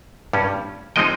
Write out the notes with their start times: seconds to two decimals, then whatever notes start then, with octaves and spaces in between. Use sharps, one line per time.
0.33 G2 G3 C#4
0.96 F3 G#3 C4 D#4 D#5 G5